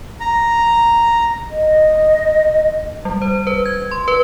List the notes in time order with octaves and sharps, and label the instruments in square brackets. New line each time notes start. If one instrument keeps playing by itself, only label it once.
[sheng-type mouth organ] A#5
[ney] D#5
[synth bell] G3
C5
B4
G#6
C6
B4